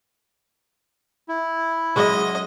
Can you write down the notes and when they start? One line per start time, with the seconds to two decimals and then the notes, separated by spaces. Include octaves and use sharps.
1.28 E4
1.96 F#3 G#3 C#4 D#5